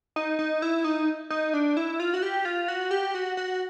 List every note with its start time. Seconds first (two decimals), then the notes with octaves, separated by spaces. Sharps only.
0.16 D#4
0.39 D#4
0.62 E4
0.84 D#4
1.30 D#4
1.53 D4
1.77 E4
2.00 F4
2.14 F#4
2.23 G4
2.45 F4
2.68 F#4
2.91 G4
3.14 F#4
3.37 F#4